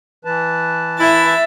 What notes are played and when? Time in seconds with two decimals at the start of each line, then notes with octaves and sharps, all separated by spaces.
0.25 E3 B4 A5
1.00 E4 E5 A6